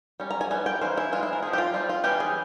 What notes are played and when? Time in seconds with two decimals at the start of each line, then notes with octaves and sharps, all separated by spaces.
0.20 G3 C#4
0.30 A#5
0.41 G#5
0.51 E3 G3 C#4 G#5
0.66 G5
0.81 E3 A#3 C#4 C5
0.97 E4
1.12 E3 G#3 C4 F4
1.23 E4
1.33 A#4
1.42 F3 C4 G#4
1.53 G4
1.58 F4
1.74 G3 C4 F4
1.89 F4
2.04 E3 G3 C#4 G4
2.20 G#4